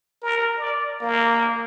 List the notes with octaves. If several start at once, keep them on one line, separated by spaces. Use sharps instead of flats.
A#4
D5
A#3